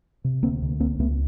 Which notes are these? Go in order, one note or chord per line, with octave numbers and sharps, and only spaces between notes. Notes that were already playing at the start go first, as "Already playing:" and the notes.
C3
D2 A#3 C4
D2
C#2 A#3 C4
C#2 A3 B3